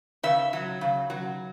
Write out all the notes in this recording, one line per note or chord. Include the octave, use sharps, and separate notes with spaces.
C#3 E5
F#3
C#3
F#3